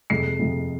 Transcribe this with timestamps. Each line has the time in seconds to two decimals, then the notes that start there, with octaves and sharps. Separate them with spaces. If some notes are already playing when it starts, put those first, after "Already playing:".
0.10 F2 C3 G#3 C7
0.40 F2 C3 G#3